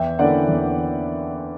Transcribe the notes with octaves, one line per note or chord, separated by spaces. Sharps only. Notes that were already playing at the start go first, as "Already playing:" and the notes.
Already playing: E2 E5 G5
D3 A#3 C#4 E4 D5 F#5
E2